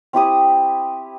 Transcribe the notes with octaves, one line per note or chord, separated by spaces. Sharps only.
C4 E4 G4 D#6